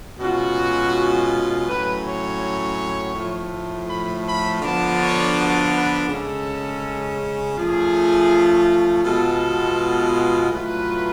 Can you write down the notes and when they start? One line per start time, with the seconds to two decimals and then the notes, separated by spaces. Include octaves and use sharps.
0.20 B2 G#3 C#4 F4 F#4
1.67 A2 F#3 C#4 B4
2.04 C#5
3.15 A2 F3 A3 F4
3.88 B5
4.26 B5
4.62 D3 F3 B3 D4 F4 A5
4.99 C#5
5.36 F#4
5.72 B4
6.09 C#3 G#3 C#4 A4
7.57 F3 A3 C#4 F4 G#4
9.04 B2 G#3 B3 F4 A4
10.52 A2 F#3 A3 F4 B4